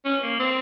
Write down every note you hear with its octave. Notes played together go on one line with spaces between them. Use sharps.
C#4
A#3
C4